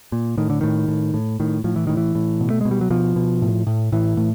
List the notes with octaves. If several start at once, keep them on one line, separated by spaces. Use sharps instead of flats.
A#2
A2 D#3
D3
A2 D#3
A2
A2
A2 D#3
A2 F3
E3
A2 D#3
E3
A2
B2
A3
B2 G#3
G3
F#3
B2 F3
B2
A2
A2
A2 E3
A2